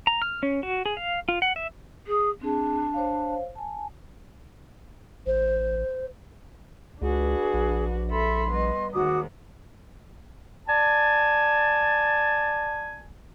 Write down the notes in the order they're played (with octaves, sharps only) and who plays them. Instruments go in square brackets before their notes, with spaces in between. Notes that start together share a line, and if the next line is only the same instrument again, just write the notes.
[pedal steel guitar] A#5
F6
C#4
F#4
G#4
F5
F4
F#5
E5
[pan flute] G#4
[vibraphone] C4 G#4 [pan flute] D4
[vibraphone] C5 C#5 F5
G#5 A5
[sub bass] A1 [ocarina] C5
[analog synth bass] C#2 [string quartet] D4 F#4 B4 [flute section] G#4
[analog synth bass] A#1
[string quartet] A4 E5 B5 [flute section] C6
[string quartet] G3 B3 D#5
[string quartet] D#2 G#2 D#3 [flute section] F#4 D6 D#6
[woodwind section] D5 G#5 A5